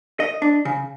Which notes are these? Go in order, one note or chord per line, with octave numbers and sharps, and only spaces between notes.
D#5
D4
C#3